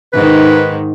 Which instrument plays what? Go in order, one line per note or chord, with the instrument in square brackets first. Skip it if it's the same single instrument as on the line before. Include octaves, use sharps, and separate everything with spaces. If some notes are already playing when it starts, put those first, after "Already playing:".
[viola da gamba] G#2 D#3 [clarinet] B4